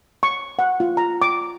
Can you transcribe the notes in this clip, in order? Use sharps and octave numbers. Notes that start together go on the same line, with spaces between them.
C#6
F#5
F4
A#5
D6